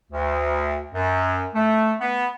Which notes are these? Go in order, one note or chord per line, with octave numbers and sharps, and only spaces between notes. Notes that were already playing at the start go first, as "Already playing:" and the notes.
D2
F#2
A3
B3